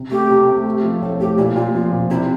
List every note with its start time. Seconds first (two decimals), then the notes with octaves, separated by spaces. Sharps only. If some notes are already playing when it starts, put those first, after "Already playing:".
Already playing: C3
0.11 A3 G4
0.30 C3
0.48 A3
0.65 A3
0.83 F3
1.02 A2 A4
1.20 A2 G4
1.38 A#2 E4
1.56 A#2 F4
1.74 F3 F4
1.92 A#2
2.10 C3 E4